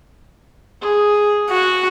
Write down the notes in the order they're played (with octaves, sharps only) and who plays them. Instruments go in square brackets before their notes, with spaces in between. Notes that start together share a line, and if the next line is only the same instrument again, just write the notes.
[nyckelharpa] G#4
[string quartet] F#4